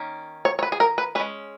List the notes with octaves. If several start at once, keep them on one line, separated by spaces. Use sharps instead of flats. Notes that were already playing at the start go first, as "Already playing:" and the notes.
Already playing: D#3 A#3 C#4
C#5
C#5
B4
G#4
A#4
B4
G#3 C#4 B4